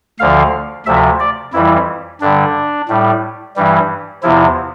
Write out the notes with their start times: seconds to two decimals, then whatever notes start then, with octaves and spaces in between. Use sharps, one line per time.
0.19 D2 D3 F3 F5
0.86 D2 C3 F3 E5
1.20 D5
1.53 F2 E3 G3 E4
2.21 G2 D3 G3 D4
2.88 A2 G3
3.56 G2 E3 G3
4.23 E2 C3 F3 E4